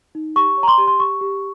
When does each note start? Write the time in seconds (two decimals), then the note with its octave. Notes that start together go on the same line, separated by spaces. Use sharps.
0.15 D#4
0.36 G4 C#6
0.57 C#5
0.63 A#5
0.68 C6
0.78 G4
0.87 C6
0.99 G4 C#6
1.21 G4